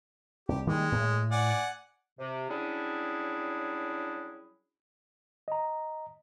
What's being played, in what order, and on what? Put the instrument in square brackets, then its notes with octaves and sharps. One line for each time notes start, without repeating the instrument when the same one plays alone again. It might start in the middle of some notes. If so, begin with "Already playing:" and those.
[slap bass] C2 [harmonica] G4
[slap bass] D#3 G3 A#3 [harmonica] G#3
[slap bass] A2
[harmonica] D5 F#5 G#5
[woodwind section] C3
F#3 G3 C#4 D4 E4 G#4
[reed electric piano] D#5 A#5